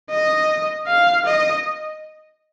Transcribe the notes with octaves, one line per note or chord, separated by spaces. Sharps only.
D#5
F5
D#5